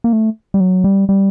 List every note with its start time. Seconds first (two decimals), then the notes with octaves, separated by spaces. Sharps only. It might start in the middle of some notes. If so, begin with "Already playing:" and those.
0.04 A#3
0.13 A3
0.54 G3
0.60 F#3
0.84 G3
1.09 G3